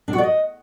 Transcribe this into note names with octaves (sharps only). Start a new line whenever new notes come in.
D4
F#4
D5
D#5